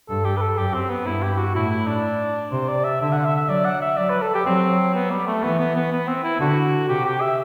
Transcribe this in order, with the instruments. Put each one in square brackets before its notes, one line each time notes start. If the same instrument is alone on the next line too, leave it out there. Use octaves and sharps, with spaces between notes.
[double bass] G2 [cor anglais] A4
[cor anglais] G4
B4
A4
[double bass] F#2 [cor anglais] G4
[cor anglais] C4
B3
[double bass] G2 [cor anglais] E4
[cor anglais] G4
F#4
[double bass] A2 [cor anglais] E4
[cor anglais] E4
D4
[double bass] C3 [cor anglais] C5
[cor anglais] D5
E5
[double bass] D3 [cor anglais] E5
[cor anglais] F#5
E5
E5
[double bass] F#3 [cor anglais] D5
[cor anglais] F#5
E5
[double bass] F#3 [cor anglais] D5
[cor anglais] B4
A4
G4
[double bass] F#3 [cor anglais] C4
[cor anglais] B3
G3
A3
[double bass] E3 [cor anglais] B3
[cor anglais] B3
B3
B3
C4
E4
[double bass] D3 [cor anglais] F#4
[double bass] C3 [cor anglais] G4
[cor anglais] G4
E5